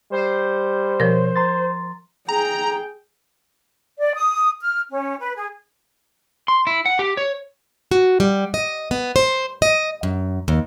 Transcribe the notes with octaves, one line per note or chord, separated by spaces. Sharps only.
G3 C5
B2 F3 A#4 C#5
A#5 C6 A6
G#4 G5 A#5
D5
D#6
F6
C#4
B4
G#4
C6
E4
F#5
G4
C#5
F#4
G3
D#5
B3
C5
D#5
F#2
D#2